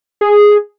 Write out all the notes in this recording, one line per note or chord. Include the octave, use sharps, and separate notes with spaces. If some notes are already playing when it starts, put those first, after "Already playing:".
G#4